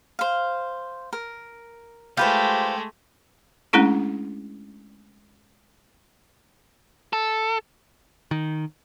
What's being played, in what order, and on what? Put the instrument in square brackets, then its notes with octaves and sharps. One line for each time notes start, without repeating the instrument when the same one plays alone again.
[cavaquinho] C5 F5
A#4
[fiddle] G#3 A3 [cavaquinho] F4 B4 C5 [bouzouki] G4
[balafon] G#3 A3 C#4 D4 E4 G#4
[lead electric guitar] A4
[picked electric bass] D#3